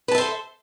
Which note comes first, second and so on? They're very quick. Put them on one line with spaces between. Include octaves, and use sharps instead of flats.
B4 A5 E5 C5 A4